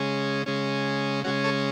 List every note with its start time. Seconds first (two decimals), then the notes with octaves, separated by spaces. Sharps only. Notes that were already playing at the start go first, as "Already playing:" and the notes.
Already playing: C#3 G#3 C#4
0.46 C#3 G#3 C#4
1.24 C#3 G#3 C#4 F#4
1.44 A4 C#5